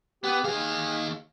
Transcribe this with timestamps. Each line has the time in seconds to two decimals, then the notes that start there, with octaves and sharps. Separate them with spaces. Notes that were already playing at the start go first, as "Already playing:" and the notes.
0.24 B3 G4 B4
0.44 D#2 G#4 F5